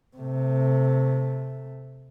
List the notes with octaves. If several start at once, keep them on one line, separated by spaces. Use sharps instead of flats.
C3 A3